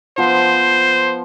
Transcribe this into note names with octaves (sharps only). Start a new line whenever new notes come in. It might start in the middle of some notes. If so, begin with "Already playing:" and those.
F3 B3 C5